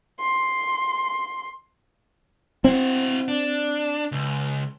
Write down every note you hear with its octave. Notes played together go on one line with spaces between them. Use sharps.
C6
C4 E4 F#4
D4
C#2